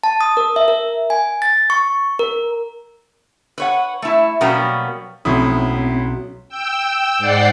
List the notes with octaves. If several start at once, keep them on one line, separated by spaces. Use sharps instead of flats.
A5
D#6
A#4
E5
A#4
G#5
A6
C#6
A#4
B4 C#5 F#5
A3 E4
B2 F#3 G3 A#3 B3 C#4
B1 A2 C4 C#4 E4 D#6
G5 E6
G#2 D5 F#5 G5 C7